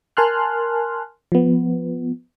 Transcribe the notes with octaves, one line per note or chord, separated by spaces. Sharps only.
A#4 G#5 A5 C6 F6 F#6
F3 B3